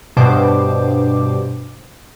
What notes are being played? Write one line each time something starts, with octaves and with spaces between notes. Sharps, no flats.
G2 B2 C5 D6